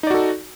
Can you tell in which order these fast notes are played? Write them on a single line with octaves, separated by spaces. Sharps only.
D#4 D5 F#4 A4